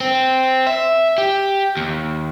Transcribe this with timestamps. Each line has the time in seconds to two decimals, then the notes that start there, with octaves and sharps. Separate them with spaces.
0.01 C4
0.67 E5
1.18 G4
1.77 D#2